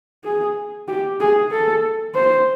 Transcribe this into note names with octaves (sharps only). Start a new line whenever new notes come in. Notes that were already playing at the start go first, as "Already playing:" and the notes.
G#4
G4
G#4
A4
C5